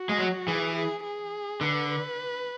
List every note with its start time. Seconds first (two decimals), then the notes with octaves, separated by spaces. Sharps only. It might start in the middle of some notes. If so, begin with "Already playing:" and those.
Already playing: F#4
0.09 G#3
0.18 F#3
0.48 E3 G#4
0.76 G#4
1.04 G#4
1.61 D3 B4